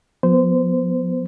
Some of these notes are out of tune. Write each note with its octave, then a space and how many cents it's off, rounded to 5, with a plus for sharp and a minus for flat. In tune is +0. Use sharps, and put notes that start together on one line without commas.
F3 +35 B3 +0 C5 -20